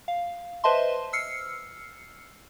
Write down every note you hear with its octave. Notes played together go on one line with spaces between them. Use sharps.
F5
B4 C5 D#5 E5 A5 C6
E6 F6 C7 C#7